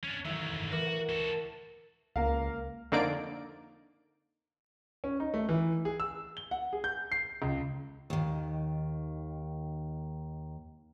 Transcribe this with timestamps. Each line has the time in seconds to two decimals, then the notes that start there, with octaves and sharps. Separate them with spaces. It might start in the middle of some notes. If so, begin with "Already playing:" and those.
0.04 C#4 D4
0.25 A1 D#3 F#3 E5 E6
0.72 E3 F#4 A#4 D6
0.86 F#5
1.09 F#4 A4
2.16 C#2 A#3 A#4 F5
2.92 F2 D3 A#3 D#4 D5 D7
5.04 C#4
5.20 D#4
5.34 A3
5.49 E3
5.85 G#4
6.00 E6
6.37 G7
6.51 F#5
6.73 G#4
6.84 G6
7.12 C7
7.42 C#2
8.10 D#2 D#3